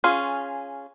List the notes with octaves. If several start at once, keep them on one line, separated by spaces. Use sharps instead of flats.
C#4 F4 G#4